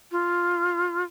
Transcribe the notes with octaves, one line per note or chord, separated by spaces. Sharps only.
F4